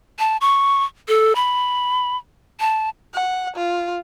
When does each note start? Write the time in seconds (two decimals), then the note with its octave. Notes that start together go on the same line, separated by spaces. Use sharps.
0.19 A5
0.41 C#6
1.08 A4
1.35 B5
2.60 A5
3.14 F#5
3.56 F4